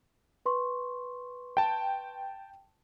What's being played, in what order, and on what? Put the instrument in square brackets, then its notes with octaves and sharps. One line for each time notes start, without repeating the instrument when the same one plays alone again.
[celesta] B4 C6 C#6
[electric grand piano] G5 A5